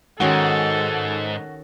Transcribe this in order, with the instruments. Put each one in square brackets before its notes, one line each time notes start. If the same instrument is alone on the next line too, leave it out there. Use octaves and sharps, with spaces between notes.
[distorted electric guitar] G#2 [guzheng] D#3 C#4 G#4 [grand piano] F#4 [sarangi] A4